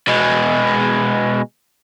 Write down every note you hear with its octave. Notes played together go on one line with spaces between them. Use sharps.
B2 G#3